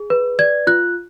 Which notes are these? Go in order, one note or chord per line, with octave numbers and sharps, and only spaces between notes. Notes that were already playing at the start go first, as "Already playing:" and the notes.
Already playing: G#4
B4
D5 G#6
F4 F#6